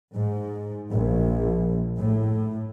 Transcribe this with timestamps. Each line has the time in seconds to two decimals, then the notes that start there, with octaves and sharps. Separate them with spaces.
0.15 G#2
0.92 A#1
1.98 A2